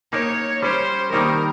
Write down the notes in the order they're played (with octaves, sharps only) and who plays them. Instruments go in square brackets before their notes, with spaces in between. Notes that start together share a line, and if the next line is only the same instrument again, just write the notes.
[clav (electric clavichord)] A#3 D#4 A#4 [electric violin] C#5
[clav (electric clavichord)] G3 C#4 G4 C#5 [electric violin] C5
[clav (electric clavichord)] D#3 G3 A#3 D#4 [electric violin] A#4